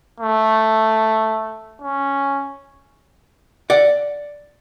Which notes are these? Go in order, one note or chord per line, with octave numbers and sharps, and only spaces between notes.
A3
C#4
D5 F#5